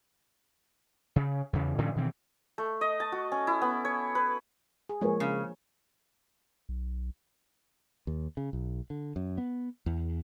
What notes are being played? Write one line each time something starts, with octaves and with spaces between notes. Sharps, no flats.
C#3
E2 C#3
A2 D3 F3 C#4
B2 D#3 E3 C4
A3
D#5
A5
F#4
C#4
E4
B3
C#5
B4
G#4
F3 G#3 A#3 A#4 C#5
C#3
B1
D#2
C#3
B1
D3
F#2
B3
E2